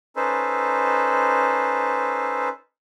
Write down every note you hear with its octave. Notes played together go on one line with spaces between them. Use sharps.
C#4 D#4 A4 B4 C5